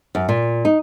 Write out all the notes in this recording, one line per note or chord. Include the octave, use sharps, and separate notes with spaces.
F#2
A#2
D#4